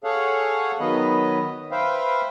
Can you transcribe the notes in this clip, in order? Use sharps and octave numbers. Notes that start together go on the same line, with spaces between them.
G#4 A4 C#5 F5 F#5
D#3 F#3 B3 B4 D#5
B4 C5 E5 F5 G5